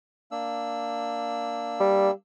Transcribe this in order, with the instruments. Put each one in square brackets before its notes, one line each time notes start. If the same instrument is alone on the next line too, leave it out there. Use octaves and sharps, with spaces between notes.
[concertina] A#3 D4 E6
[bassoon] G3